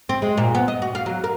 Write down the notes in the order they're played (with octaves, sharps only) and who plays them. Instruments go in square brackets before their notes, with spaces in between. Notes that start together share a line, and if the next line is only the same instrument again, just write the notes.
[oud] C4
G#3
A#2
B3
D#5
F#4
F5
F#3
A#4